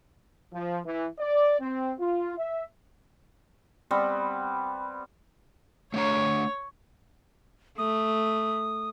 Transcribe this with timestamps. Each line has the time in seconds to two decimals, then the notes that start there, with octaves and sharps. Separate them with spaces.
0.53 F3
0.85 E3
1.20 D5
1.60 C4
1.99 F4
2.38 E5
3.91 G3 B3 C4
5.94 A3 D4 C#5 A#5
7.78 A3 D#6